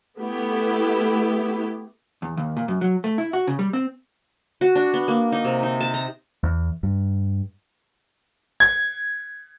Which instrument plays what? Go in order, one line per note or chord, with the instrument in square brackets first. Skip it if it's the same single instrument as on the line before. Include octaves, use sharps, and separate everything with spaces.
[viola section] A3 B3 E4 G4
[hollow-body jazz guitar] E2
D#2
A#2
F#2
F#3
A3
E4
F#4
C#3
G3
C4
[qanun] F#4
D4
B3
A#3
D#4
C3
D#4
A5
A#5
[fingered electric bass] E2
G2
[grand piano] G#6